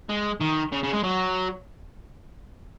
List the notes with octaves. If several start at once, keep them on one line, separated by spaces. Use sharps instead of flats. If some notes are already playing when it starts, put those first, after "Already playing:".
G#3
D#3
C#3
C#3
G#3
F#3